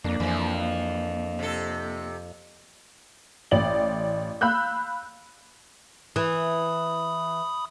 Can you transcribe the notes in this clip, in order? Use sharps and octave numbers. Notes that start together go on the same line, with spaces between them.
F2 A#3 D4
F2 E3 F3
C3 A4
A1 D5 F#7
F5 B5 E6 F#6 G6
E3 B5 D#6